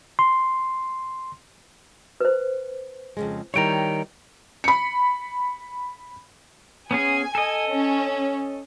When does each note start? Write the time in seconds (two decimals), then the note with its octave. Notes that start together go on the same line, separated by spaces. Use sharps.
0.19 C6
2.21 B4 C5
3.17 F2 C#3 G#3
3.54 D#3 G3 E4 C#5 G5 A#5
4.64 B5 C#7
6.91 B3 C#4 G#4 G#5
7.35 A4 D#5
7.70 C#4